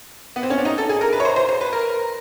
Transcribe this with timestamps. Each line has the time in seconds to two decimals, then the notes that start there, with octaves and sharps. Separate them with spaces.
0.36 B3
0.43 C4
0.50 C#4
0.58 D4
0.65 D#4
0.78 A4
0.89 G#4
1.01 A#4
1.13 B4
1.20 C#5
1.25 C5
1.36 C5
1.49 C5
1.61 B4
1.73 A#4